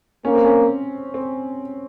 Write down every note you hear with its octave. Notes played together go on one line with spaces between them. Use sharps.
A#3 C#4
C4
C#4
C4